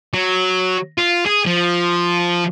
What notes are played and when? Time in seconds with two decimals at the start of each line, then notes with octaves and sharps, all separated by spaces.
0.14 F#3
0.98 F4
1.26 G#4
1.46 F3